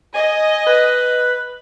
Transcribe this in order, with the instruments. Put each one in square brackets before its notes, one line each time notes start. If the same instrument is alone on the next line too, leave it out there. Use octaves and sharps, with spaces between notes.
[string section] D#5 [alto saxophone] G#5
[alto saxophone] B4